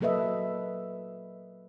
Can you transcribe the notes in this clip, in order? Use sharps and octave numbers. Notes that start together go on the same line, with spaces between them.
F#3 A#3 A4 B4 D#5 E5